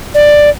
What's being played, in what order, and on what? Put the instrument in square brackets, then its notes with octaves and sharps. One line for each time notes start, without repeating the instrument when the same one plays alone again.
[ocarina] D5